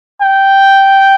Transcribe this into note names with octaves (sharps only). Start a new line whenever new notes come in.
G5